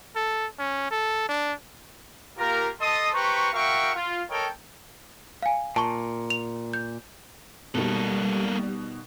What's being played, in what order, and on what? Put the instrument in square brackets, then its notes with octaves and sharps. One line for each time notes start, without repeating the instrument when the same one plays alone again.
[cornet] A4
C#4
A4
D4
[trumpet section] A#3 F4 G4 A#4
A4 D#5 A5 C6 D#6
G4 B4 C5 A#5 C#6
F#4 A#4 E5 F5 G5 C#6
F4
A4 A#4 C#5 D#5 G5
[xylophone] F5 G#5
[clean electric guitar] A#2 [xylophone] A5 C#6
[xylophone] F7
G6
[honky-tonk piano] B2 D#3 [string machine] G3 [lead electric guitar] A#3 A4